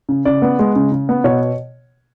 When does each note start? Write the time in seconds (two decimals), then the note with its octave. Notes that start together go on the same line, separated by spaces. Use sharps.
0.09 C#3
0.25 C#3 D5
0.42 B3
0.59 G#3
0.76 C#3
0.92 C#3
1.09 B3
1.24 B2 C#5